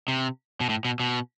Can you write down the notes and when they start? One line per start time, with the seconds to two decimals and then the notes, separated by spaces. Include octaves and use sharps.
0.08 C3
0.61 B2
0.69 A2
0.85 B2
1.00 B2